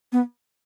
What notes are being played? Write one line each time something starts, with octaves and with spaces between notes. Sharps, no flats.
B3